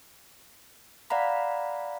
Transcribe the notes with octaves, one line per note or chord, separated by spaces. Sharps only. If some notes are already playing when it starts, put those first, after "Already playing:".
D5 F5 F#5 A#5 B5